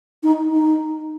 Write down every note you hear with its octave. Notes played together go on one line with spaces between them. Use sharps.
D#4
D#4